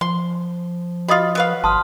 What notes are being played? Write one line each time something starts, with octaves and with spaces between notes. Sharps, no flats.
F3 C6
F4 F#4 D#5 B5 D#6
F#3 B4 F5
G#1 A5 C6 D#6 F6